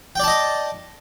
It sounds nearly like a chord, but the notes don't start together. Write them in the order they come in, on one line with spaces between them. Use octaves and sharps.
G5 D5 A5 D#5